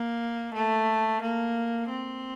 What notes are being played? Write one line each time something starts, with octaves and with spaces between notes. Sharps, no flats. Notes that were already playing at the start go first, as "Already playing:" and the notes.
Already playing: A#3
A3
A#3
C4